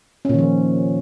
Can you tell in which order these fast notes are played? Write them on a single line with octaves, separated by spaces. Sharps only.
C#4 A#2 D#3 F3